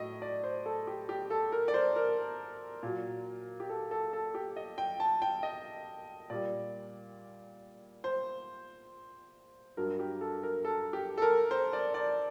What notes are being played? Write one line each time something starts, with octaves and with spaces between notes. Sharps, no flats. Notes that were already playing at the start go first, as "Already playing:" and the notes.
Already playing: A2 F#3 D#5
D5
C5
A4
G4
G4
A4
A#4
D5
C5
A#4
A#2 F#3
G4
A4
A4
A4
G4
D#5
G5
A5
G5
D#5
A#2 G3 D5
C5
G2 F#3 A#4
G4
A4
A#4
A4
G4
A4
A#4
C5
D5
D5